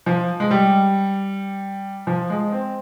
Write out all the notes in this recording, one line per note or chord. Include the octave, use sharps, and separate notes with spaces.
F3
G#3
G3
F3
G#3
C4